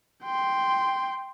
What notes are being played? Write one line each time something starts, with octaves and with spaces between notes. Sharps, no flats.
G5 C6